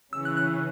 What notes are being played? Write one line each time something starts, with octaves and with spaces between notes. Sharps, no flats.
C#3 E3 C#4 E6
F#6
F#6